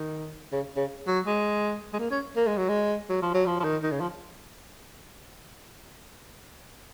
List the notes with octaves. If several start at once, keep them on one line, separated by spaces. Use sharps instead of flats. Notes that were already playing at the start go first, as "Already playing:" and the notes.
Already playing: D#3
C#3
C#3
F#3
G#3
G#3
A#3
C#4
A#3
G#3
F#3
G#3
F#3
F3
F#3
F3
F3
D#3
D#3
C#3
F3